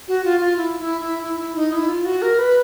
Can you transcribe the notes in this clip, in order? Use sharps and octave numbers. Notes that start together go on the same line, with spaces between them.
F#4
F4
F4
E4
E4
E4
E4
E4
D#4
E4
F4
F#4
A#4
B4